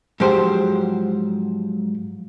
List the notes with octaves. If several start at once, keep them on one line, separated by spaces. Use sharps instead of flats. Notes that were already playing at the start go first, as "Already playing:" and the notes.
G#2 F3 F#3 G4 C5